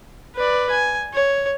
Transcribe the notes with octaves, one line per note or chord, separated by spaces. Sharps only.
B4 D5
G#5
C#5